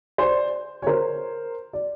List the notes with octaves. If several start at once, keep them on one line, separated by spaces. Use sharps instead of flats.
C5 D5
C#5
A#4 C5
D5